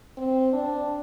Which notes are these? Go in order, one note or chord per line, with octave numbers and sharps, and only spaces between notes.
C4
D4